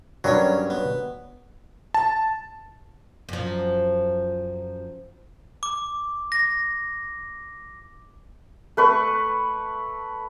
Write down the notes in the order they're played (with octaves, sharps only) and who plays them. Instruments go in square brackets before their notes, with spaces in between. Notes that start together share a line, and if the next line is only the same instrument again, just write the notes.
[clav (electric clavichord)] G2 F#3 [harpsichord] C#4 A#4 D#5
[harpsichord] B3
[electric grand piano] A5
[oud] F#2 F3
[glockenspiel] D6
A#6
[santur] A3 B4 C#6